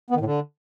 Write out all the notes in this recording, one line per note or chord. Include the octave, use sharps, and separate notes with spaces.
B3
D#3
A2
D3